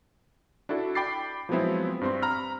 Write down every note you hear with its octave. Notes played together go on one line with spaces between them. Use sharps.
D4 E4 F#4 A4
G5 B5 D6 A6 C7
F3 F#3 G#3 B3 C4 E4
G2 C4 C6
A#5 B5 F6